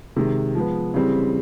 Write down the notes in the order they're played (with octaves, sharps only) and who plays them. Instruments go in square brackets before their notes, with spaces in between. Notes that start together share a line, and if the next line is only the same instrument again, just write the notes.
[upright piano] C3 D#3 G#3
F3 G#3 B3
C#3 E3 G3 C4